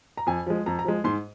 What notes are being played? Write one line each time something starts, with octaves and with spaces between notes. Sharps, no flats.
A#5
F2 G#5
F3 G#3
F2 A#5
A#5
F3 G#3
G#2 C6